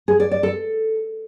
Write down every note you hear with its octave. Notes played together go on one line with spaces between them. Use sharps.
G#4
D5
D5
A4